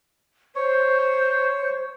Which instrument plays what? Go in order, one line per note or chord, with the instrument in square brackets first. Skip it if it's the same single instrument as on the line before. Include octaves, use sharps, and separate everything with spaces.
[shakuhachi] C5 [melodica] C#5